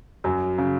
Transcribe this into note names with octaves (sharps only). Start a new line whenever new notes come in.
F#2 F#3
C#3